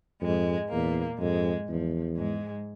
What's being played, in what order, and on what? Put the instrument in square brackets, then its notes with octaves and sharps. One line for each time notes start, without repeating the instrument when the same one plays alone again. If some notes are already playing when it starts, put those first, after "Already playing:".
[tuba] F2 [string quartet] G#2 G#3
[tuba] E2 [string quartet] A#2 A#3
[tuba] F2 [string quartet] G#2 G#3
[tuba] E2 [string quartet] F3
[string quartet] G#2 G#3